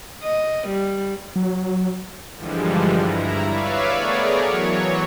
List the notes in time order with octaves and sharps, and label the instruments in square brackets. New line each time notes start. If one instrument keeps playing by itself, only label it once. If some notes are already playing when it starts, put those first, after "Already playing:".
[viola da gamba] D#5
G3
[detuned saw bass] F#3
[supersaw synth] G2 D3 E3 F3 G3 G#3
G2 E4 A#5
B4 C#5 D5 E5 F5
A3 B3 G#4 A#4 C#5 D5
E3 F#3 C#5